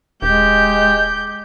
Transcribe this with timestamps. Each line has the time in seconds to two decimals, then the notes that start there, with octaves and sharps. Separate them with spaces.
0.22 D#1 G#3 G4 G6